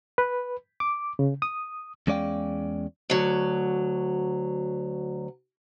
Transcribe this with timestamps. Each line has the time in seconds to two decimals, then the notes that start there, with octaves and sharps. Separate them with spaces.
0.18 B4
0.80 D6
1.19 C#3
1.42 D#6
2.07 E2 G#3 C#4 D5 F5 G5
3.10 D2 F#3